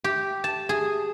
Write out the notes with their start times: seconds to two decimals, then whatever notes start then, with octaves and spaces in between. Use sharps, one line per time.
0.04 G4
0.44 A5
0.69 G#4